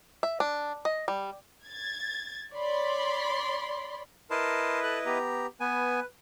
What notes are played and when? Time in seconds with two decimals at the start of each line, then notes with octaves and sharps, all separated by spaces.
0.23 E5
0.40 D4
0.85 D#5
1.08 G3
1.65 G#6 A6
2.54 C#5 D5 B5 C6
4.31 E4 A#4 B4 D#5 A5 C6
4.83 A4 F#6
5.06 B3 G4 A#5
5.60 B3 B4 G#5